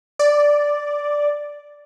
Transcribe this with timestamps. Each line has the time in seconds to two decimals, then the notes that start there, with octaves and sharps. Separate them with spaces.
0.19 D5